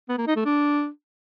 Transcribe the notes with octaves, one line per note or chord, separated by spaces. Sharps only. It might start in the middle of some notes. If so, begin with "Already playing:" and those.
B3
A#3
D#4
A3
D4